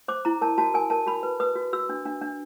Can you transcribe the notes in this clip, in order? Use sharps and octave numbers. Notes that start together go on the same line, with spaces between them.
C5 D6
E4 A#5
A#4 A5
F#4 A5
A#4 G#5
A#4 A5
F#4 B5
B4
B4 D#6
F#4
F#4 E6
D4
D4
D4